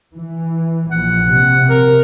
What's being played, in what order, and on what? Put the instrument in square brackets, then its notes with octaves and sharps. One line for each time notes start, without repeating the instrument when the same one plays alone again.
[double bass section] E3
[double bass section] A#1 [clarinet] F#5
[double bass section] C3
[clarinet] A#4